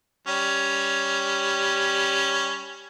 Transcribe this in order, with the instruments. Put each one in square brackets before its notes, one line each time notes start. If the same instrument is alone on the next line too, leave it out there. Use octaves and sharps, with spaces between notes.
[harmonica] G3 C#4